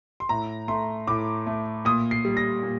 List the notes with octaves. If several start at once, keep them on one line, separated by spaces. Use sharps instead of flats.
C6
A2 A#5
A3 C6
A2 D6
A3
A#2 D#6
C7
G3
A#6
A#2